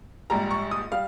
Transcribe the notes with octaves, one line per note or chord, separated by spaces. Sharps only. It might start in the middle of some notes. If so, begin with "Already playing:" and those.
A#1 G#2 G3 A#5
C#6
D#6
G3 F5